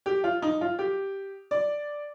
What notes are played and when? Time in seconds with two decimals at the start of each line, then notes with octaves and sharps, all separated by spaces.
0.06 G4
0.24 F4
0.42 D#4
0.61 F4
0.79 G4
1.51 D5